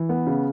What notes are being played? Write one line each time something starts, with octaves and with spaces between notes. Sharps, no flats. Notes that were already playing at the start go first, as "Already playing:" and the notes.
Already playing: E3
B3
C#3